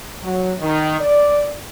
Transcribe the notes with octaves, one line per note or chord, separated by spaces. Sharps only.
F#3
D#3
D5